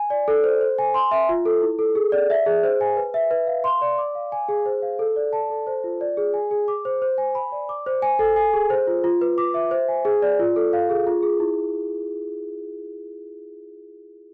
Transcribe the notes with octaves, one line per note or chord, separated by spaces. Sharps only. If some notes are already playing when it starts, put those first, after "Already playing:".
Already playing: G#5
D5
A4
C5
C5
G#5
C6
E5
F4
A4
E4
A4
G#4
D5
E5
G#4
C5
G#5
B4
E5
B4
F5
C6
D5
D6
F5
G#5
G#4
C5
F5
A4
D5
A5
A4
C5
F4
D5
G#4
G#5
G#4
D6
C5
C5
G#5
B5
D5
D6
C5
G#5
A4
G#5
G#4
C5
F4
F4
B4
D6
E5
C5
G#5
G#4
D5
F4
A4
F5
G#4
F4
G#4
E4